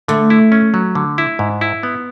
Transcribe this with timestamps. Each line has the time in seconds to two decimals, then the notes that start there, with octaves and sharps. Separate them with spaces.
0.08 D3 A3
0.30 E4
0.52 C#4
0.74 F#3
0.95 D3
1.18 E4
1.39 G#2
1.61 E4
1.83 B3